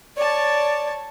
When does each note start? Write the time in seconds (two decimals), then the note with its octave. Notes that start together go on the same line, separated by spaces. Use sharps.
0.17 C#5 D5 A5